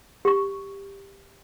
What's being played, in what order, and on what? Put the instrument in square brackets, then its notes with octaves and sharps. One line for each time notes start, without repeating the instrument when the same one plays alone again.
[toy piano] G4 C#6